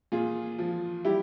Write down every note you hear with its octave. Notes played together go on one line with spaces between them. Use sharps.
A#2 F4 G#4
F3
G3 E4 G4